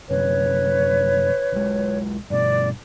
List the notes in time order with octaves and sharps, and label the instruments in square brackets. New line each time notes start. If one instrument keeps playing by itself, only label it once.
[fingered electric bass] F#1 F#2 C3 [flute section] B4 C#5
[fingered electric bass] B1 G#3
[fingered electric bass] G2 B2 [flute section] D5